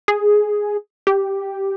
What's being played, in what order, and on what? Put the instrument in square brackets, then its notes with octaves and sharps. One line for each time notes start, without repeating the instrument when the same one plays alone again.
[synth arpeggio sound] G#4
G4